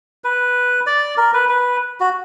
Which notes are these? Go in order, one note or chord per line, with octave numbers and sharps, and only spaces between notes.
B4
D5
A#4
B4
B4
F#4